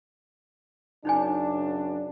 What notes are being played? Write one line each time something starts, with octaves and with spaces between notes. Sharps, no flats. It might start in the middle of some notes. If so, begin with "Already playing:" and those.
F#2 C#3 D4 D#4 C#5 G#5